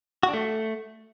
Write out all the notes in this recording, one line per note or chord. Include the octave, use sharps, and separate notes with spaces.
F#4
D4
A3